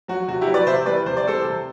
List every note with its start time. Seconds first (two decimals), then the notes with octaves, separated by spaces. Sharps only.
0.08 F#3 F#4
0.28 C3 F#4
0.41 E4 G4
0.47 F#3
0.54 B4 D5
0.67 C3 C5 E5
0.86 E3 G3 B4 D5
1.06 C3 C5
1.17 D5
1.25 E3 G3 A4 C5
1.45 C3